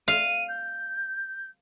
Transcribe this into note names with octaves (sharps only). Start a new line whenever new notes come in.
F5 D#7
G6